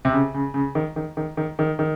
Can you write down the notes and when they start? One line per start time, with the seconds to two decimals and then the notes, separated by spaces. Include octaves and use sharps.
0.05 C3
0.13 C#3
0.34 C#3
0.54 C#3
0.75 D#3
0.96 D#3
1.17 D#3
1.37 D#3
1.59 D#3
1.79 D#3